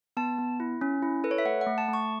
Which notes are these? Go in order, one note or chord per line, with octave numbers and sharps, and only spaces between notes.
B3 A5
B3
E4
C#4
E4
A4 B4
C#5
E5
A3 F#5
F#5
A3
A5
A3
C#6